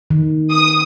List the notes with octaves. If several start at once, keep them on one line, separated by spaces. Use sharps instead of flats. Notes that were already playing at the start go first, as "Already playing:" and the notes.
D#3
D#6